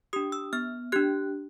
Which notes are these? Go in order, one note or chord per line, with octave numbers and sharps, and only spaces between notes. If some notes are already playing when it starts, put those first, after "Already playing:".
D4 G4 D#6
E6
B3 F6
D4 G4 F#6